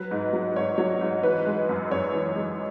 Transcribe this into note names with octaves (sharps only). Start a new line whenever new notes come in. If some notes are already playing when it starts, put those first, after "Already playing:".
Already playing: F#3 B4
G#2
F#3
G#2 C#5
F#3 C#5
G#2
E3 B4
G#3
F#2
F#2 C#5
E3
G#3